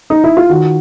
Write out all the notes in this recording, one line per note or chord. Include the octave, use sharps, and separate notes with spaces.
D#4
E4
F4
D#3 F#4